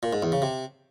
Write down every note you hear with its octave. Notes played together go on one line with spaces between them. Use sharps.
A#2
G#2
E2
C#3
C3